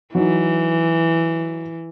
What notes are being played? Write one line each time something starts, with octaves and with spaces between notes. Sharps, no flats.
E3 F#3 D#4